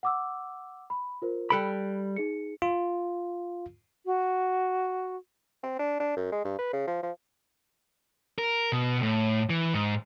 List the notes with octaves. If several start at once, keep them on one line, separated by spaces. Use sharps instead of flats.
F#5 D6 E6
B5
F4 A#4 C5
G3 A4 B5 F#6 D7
D#4 G#4 C#7
F4
F#4
C4
D4
D4
F#2
G#3
G2
B4
C#3
F3
F3
A#4
B2
A2
E3
G#2